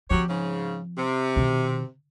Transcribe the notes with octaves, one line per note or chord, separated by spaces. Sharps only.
F3 F#3 C4 G4 C#5
G#2 C#3
C3
B2 D#3